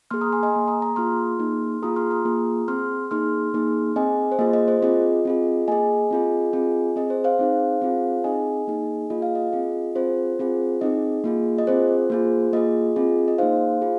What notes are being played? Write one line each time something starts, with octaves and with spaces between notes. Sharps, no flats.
A#3 G#4 C6 F6
A#5 D#6
G#5 C6
D#5 G#5
A#3 G#4
A#5 D#6
A#5 D#6
A#3 F4 G#4 C6 F6
A#3 D#4 G#4
A#3 F4 G#4 A#5 D#6
C6 F6
A#5 D#6
A#3 F4 G#4
C4 G#4 C6 F6
A#3 D#4 G#4 C6 F6
A#3 D#4 G#4
C4 G#4 D#5 G#5
C5
A#3 F4 G#4 D#5
D#5
C5
C4 F4 G#4 D#5
C4 F4 G#4
A#3 G#4 D#5 G#5
C4 F4 G#4
C4 F4 G#4
C4 G#4 D#5
C5
C5 F5
C4 D#4 G#4
C4 F4 G#4
C4 D#4 G#4 D#5 G#5
A#3 D#4 G#4
A#3 F4 G#4 D#5
F5
D#5
C4 F4 G#4
C4 F4 G#4 C5
C4 F4 G#4
C4 D#4 G#4 D#5
A#3 F4 G#4
D#5
C4 F4 G#4 C5
A#3 F4 G#4
A#3 F4 G#4 D#5
C4 F4 G#4
D#5
A#3 D#4 G#4 C5 F5
F4 G#4